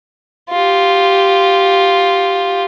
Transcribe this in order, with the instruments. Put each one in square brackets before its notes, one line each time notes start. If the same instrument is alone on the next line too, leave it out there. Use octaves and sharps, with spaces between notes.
[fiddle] F4 G4